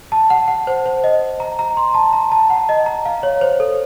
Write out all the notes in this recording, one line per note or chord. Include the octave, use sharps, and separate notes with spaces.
A5
F#5
F#5
C5
C5
D#5
A#5
A#5
C6
A5
A#5
A5
F#5
D#5
A#5
F5
C#5
C5
A4